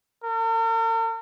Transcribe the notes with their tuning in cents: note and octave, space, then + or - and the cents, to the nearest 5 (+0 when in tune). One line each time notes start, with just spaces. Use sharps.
A#4 -45